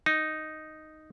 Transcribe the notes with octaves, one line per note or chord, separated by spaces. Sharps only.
D#4